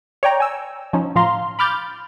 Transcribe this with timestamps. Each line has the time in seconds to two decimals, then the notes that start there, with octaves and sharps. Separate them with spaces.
0.23 C#5 D5 G5 A#5
0.40 G#5 E6
0.93 F3 C#4 D#4
1.15 A2 F3 F4 F5 A#5 C6
1.59 B5 D6 F6 G6 A6